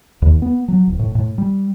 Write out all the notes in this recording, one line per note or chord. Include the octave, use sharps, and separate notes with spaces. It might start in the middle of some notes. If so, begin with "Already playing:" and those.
D#2
B3
F#3
D1
A2
A2
G3